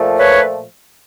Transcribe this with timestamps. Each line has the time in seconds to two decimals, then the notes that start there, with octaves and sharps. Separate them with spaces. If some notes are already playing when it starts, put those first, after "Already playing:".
Already playing: A#2 F3 A3
0.17 B4 C#5